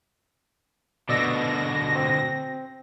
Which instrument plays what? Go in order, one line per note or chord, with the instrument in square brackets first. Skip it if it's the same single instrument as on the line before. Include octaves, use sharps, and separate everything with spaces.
[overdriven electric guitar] B2 D3 [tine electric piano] D5 D#5 E6 [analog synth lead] A#6
[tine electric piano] C4